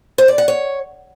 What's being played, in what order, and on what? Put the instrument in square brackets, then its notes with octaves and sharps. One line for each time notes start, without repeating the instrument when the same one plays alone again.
[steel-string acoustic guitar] C5
D5
F#5
C#5